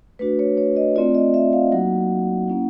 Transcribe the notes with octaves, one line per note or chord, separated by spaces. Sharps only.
A3 D4 F#4 B4
C#5
C#5
D#5
A3 C4 F4 D5
D#5
E5
F5
F#3 A#3 D#4 F#4 F#5
A#3 C#4 E4